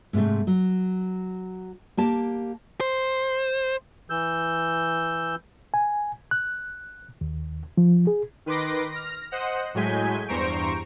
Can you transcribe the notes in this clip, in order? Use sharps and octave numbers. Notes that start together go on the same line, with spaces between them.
G#2 C3 G#3 A3
F#3
A#3 G4 A5
C5
E3 E6 G6
G#5
F#6
D#2
F3
G#4
D#3 B4 C6 D6 A#6
F6 A#6
C5 D#5 F#5
A2 F#3 G#3 G#5 G6 B6
E2 G2 C5 A#5 C#6 D7